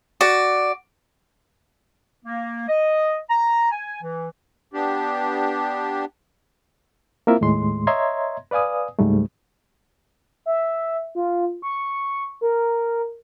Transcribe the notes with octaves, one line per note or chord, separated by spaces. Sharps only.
F#4 D5
A#3
D#5
A#5
G#5
E3
B3 D4 G4
A#3 C4 E4 F4 A#4 E5
D#2 A2 G#3 C6
C#5 D#5 E5 A#5 C6 G#6
B4 D5 F5 G#5 D#6
C#2 G#2 G3 A3
E5
F4
C#6
A#4